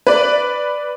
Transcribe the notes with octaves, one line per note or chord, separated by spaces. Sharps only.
B4 D5